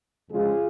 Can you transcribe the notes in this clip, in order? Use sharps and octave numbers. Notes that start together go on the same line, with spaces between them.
F2 C#3 G#3 F4 G#4